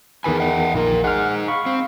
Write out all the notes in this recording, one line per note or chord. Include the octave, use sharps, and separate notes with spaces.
E2 D#3 G#4 B4 G#5 B5
D#5 F#5 G5
A#1 A#2 D#3 A#4
D#4 G#4 F#5 F6
F5 B5 C#6
C4